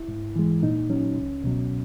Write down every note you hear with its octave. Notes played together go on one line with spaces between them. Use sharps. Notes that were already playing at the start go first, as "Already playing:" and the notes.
Already playing: E4
G#2
E3 G#3
A#2 D#4
F#3 C#4
C#2
B2 F#3